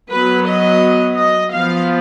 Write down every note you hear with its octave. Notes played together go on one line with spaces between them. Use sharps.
F#3 B3 B4
D#5
D#5
F3 B3 F5